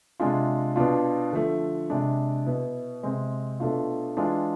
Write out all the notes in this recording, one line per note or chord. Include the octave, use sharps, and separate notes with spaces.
C3 G#3 D4 F4
B2 B3 D4 F4
D3 F3 A3
C3 G#3 D4
B2 B3 E4
C3 G#3 C4
B2 A3 D4 F4
E3 G#3 D4 F4